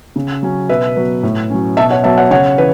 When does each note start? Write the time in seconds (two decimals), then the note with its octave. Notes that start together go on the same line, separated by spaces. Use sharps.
0.16 C#3
0.43 F#3 C#4
0.69 B2 B4 E5
0.96 F#3 B3
1.23 A2
1.50 F#3 C#4
1.77 B2 E5 A5
1.91 C#5 F#5
2.04 F#3 B3 E5 A5
2.18 C#5 F#5
2.31 C#3 C#5 F#5
2.58 E3 B4